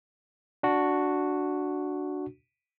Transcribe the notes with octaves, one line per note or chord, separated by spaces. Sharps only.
D4 F#4